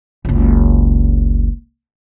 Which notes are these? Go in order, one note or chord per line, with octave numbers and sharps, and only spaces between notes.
F#1 C#2